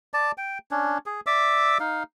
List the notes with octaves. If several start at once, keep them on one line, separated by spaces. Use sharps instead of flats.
D5 A5
G5
C#4 D4
G#4
D5 E5 D6 E6
D#4 F5